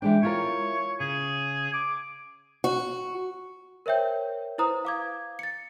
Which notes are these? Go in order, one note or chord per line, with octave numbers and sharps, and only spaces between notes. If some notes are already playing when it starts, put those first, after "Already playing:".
E3 G#3 D4 G5
E4 F4 A#4 C#5
C#3 G#4
D6
F#4
A#4 C5 C#5 E5 G5 G6
E4 B4 C5 A#5 D#6
F5 D6 G#6
A6 C#7